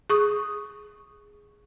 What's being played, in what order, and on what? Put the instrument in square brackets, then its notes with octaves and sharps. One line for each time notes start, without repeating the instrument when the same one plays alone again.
[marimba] G#4 C#6 D#6